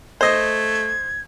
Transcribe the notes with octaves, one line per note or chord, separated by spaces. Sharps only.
A3 C5 D#5 G#6